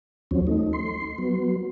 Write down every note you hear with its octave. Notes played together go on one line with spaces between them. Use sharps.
D#2 F3 F#3 C4 C#4
A3 D#4
C6
F#3 B3